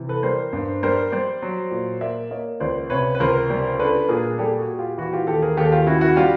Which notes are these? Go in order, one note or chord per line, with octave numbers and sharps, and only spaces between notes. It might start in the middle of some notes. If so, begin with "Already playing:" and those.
Already playing: C3 E3
A4 B4
G3 A#4 C5
G2
G3 A#4 C5
G3 C5 D5
F#3
A#2
A#3 D5 E5
A#3 C#5 D#5
C#2 C5 D5
C3 B4 C#5
B4
C#2 A#4 C5
G3
D4 A4 B4
A#2 G#4 A#4
G3 G4 A4
F#4 G#4
A#2
F4 G4
E3 E4 F#4
F4 G4
D#2 G4 A4
G#4 A#4
D#2 G4 A4
F4 G4
C#3 E4 F#4
E4 F#4
G3 F4 G4